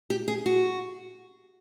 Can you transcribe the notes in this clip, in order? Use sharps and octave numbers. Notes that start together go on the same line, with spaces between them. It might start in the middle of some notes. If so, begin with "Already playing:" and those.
G4
G#4
F#4